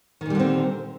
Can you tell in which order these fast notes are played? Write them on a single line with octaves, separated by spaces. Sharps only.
D#3 A#2 G3 D3 C4